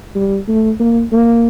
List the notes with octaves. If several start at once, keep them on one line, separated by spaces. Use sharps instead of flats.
G3
A3
A#3
A#3